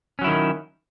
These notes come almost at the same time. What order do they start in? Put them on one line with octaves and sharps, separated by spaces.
C#4 F#3 E4 D#3